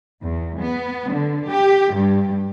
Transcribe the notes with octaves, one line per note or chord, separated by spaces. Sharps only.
E2
B3
D3
G4
G2